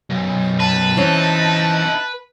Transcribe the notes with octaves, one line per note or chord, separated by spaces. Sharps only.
B1 F#2
B4 A5
E3 C4 C#4 D#4 E4